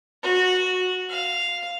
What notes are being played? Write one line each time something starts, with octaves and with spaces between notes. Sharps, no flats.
F#4
F5